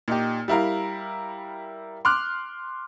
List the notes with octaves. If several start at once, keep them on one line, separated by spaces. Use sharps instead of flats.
A#2 D#4 G4
G3 E4 A#4 F5
C6 D6 F6 F#6